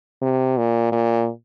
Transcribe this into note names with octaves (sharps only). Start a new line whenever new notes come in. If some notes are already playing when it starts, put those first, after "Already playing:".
C3
A#2
A#2